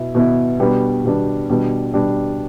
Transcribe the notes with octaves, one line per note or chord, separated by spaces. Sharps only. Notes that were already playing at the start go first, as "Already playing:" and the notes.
Already playing: B2 B3 E4
B2 B3 E4
B2 G3 B3 D4
B2 G3 B3 D4
B2 G3 D4
B2 G3 D4